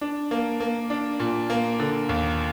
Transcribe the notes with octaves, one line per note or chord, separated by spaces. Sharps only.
D4
A#3
A#3
D4
A#2
A#3
D3
D#2